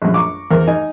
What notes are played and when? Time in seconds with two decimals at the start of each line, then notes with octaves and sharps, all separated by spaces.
0.02 A#1 F#2
0.14 A#5 C#6 D6
0.51 E2 A#4 C5
0.67 D#4 D#5 G#5